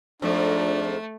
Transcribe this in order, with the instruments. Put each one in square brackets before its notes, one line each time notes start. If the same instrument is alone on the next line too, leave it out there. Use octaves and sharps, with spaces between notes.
[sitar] F2 G#2 [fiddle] A3 [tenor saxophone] D4